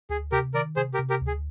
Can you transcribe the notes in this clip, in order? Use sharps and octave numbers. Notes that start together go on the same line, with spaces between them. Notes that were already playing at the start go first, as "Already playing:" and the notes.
D2 G#4
C3 G4 A#4
D#3 A#4 D5
C3 G#4 C5
G4 A#4
C3
G4 A#4
D2
G#4